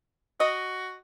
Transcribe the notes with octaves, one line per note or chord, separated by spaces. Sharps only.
F#4 D#5